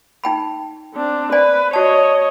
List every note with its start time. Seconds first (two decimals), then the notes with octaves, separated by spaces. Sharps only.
0.24 D#4 G5 B5
0.94 C4 D4
1.32 B4 C5 D5 G#5
1.73 F#4 C#5 D#5 A5